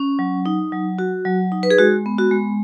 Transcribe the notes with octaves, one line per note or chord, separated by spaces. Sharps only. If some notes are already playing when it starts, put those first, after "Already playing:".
Already playing: C#4
F#3
D#4
F#3
F#4
F#3
D#4
B4
G#4
G#3 F#4
B3
F#4
G#3